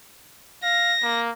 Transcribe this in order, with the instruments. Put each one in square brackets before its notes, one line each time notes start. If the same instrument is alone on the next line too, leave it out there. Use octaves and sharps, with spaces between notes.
[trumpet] F5 [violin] A#6
[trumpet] A#3